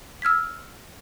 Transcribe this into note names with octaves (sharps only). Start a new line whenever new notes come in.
E6 F6 G#6 B6